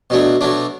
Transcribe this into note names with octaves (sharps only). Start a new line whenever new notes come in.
B2 F#3 A3 D4
B2 F#3 A3 D4